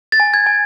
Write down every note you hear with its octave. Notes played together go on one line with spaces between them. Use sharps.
A6
G#5
G#6
G#5